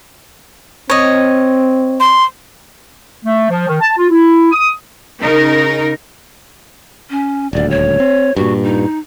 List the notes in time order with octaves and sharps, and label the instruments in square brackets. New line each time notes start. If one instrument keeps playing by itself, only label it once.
[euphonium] C4 [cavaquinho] C#5 D#5
[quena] C6
[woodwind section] A3
F3
D#3
A5
F4
E4
D#6
[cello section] C#3 D#4 A#4
[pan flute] C#4
[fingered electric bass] D#1 D2 [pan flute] D5
[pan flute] C#5
[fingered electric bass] C4
[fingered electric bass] G2 A#2 [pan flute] F#4
[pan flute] D#4